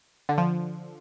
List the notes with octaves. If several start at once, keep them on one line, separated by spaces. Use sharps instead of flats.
D3
F3